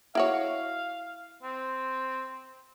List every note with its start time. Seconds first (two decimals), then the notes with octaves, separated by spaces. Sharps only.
0.15 E4 F#4 C#5 F5
1.43 C4